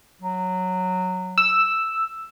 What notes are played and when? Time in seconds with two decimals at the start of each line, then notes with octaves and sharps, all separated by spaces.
0.22 F#3
1.38 E6